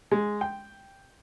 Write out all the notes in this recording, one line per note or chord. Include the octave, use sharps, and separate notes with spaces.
G#3
G5